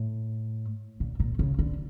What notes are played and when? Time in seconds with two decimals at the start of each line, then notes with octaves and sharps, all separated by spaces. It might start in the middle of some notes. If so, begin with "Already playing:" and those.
Already playing: A2
1.00 A#2
1.20 A#2
1.39 C#3
1.59 D3